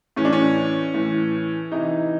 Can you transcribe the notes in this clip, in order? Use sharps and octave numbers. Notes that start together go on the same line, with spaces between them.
A2 E3 C#4
D4
C#4
A2 E3
C3 E3 D#4